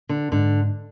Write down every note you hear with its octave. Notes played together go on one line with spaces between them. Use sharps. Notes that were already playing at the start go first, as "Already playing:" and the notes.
D3
G#2 D3